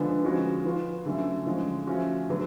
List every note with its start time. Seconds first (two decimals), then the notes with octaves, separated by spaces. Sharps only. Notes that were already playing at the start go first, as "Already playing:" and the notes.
Already playing: D3 F3 G#3 B3 D4
0.24 F3 G#3 C#4 F#4
0.65 F3 B3 F4
1.05 D3 F#3 A3 C#4 F#4
1.46 D3 F3 G#3 C#4
1.87 F3 A3 C#4 F#4
2.29 D3 F#3 B3